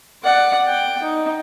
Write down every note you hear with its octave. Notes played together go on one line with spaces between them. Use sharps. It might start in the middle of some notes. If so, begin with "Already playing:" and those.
D5 F#5
G5
D#4